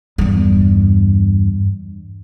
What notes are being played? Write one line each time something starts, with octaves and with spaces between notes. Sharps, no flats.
E2 G2